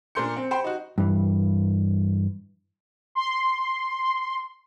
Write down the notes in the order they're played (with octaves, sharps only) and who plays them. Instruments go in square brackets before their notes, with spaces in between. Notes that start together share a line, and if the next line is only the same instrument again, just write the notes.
[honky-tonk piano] A#2 D4 A#4 C6 G6 C#7
C4
C5 G5 B5 C6
D#4 F#4
[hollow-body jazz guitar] G2 E3
[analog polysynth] C6